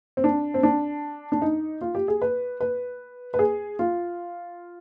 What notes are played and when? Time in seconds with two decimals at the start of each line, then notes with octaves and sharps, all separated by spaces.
0.17 C4
0.24 D4
0.54 C4
0.63 D4
1.32 D4
1.42 D#4
1.81 F4
1.95 G4
2.08 G#4
2.22 B4
2.60 B4
3.34 B4
3.39 G#4
3.79 F4